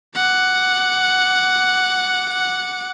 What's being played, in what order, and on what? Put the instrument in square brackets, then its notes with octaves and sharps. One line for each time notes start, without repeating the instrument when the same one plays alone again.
[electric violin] F#5 D6